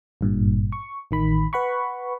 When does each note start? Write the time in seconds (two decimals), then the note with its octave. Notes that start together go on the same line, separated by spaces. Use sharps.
0.21 G#1 G2 A#2
0.72 C#6
1.11 A1 D#3 B5
1.53 B4 F#5 B5 C#6